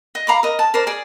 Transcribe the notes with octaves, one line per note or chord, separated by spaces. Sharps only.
D#5
F5 A#5 B5 D6
A#4 D#5
A5
A#4 C5 D5
G#4 D5